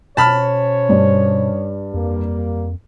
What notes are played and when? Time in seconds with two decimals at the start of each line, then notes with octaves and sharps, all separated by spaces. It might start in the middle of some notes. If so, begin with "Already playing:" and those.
0.17 B2 C#4 C5 C#5 A5 B5 F6
0.89 G2
1.94 F2 G3 A#3